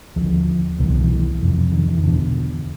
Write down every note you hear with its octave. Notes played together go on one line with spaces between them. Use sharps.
D#2 D3 F3
C2 B2 F3
E3
D#3
E3
F2 C3
D#3
D#3
E3
E2 B2 D3